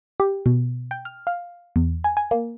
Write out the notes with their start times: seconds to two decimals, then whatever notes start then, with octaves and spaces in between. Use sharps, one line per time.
0.20 G4
0.46 B2
0.91 G5
1.05 F6
1.27 F5
1.76 E2
2.04 G#5
2.17 G#5
2.31 A#3